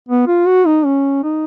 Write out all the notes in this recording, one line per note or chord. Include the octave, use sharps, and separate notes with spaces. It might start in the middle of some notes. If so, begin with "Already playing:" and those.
B3
F4
F#4
D#4
C#4
D#4